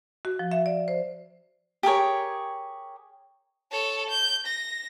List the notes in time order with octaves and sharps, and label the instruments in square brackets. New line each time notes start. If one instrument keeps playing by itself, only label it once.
[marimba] F#4
F3
E5
D5
C5
[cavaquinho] G4 G#4 A#4 C#5
[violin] A4 C#5
G6
A#6